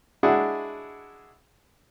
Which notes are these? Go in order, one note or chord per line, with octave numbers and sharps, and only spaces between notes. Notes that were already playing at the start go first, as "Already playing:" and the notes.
G#3 D4 E4 F#4 G#4 F#5